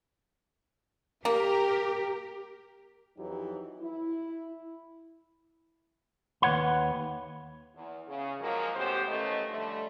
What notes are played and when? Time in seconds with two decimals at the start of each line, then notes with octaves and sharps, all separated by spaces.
1.25 A#3 G4 A#4
3.17 F2 E3 F#3 D#4 G4
3.79 E4
6.42 D#2 B4 C#5 F#5 B5
7.75 E2
8.08 C#3
8.40 F3 F#3 G#3 A#3
8.75 A2 C#3 B3 G4 C5
9.07 D#2 E3 A3 C#4 D#5
9.49 D3 F3 G3 A3